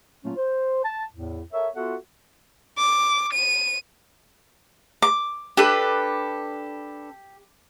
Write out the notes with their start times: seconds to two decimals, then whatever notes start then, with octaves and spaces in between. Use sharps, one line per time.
0.25 A#2 F#3 A3 A#3 C#4 F4
0.36 C5
0.84 A5
1.13 E2 A2
1.53 A4 A#4 C#5 E5
1.75 B3 F4 F#4 A4 E5 F#5
2.78 D6
3.33 D#7
5.02 D6
5.57 D4 G4 A4 B4